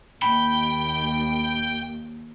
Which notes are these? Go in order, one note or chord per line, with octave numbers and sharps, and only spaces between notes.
D#2 G5 B5